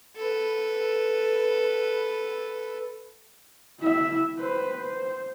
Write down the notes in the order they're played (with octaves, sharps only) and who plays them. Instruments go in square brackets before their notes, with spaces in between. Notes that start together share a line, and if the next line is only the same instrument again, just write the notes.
[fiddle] A4 B4
[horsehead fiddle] E4 E5
B4 C5
C5